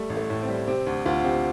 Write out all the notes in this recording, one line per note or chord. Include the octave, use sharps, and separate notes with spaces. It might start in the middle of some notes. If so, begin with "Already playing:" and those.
Already playing: G3 A3
A1
A3
A2
C4
G3
C3 C4
D2
D2 F4
C3 C4